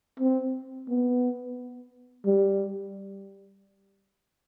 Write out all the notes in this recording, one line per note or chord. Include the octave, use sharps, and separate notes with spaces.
C4
B3
G3